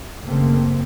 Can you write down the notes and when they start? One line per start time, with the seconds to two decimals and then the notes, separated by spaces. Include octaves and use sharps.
0.24 F#1 D#2 C#3 A3 A#3 C4